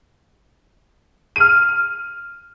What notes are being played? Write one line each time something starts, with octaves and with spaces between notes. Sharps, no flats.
F6 D#7